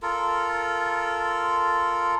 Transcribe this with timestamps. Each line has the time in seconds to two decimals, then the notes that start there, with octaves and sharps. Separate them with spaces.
0.02 F4 A4 A#4